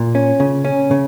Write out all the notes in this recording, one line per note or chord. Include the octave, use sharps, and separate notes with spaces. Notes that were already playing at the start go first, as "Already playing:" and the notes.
Already playing: A#2
C#4
C#3
C#4
C#3